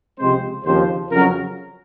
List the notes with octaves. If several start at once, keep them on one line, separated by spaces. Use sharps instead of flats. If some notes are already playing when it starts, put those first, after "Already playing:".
C#2 C3 F3 G#3 C4 C5
D#2 C#3 F3 C4 C5
F2 C#3 F#3 C#4 A#4